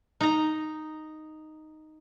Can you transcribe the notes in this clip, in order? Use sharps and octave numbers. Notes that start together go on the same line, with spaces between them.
D#4 A#5